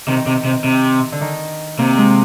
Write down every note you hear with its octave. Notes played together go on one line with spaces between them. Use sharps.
C3 D#3
C3
C3
C3
D3
D#3
C3 A#3
G#3